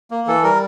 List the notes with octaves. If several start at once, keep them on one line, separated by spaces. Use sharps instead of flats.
A#3
E3 A4
G3 A#4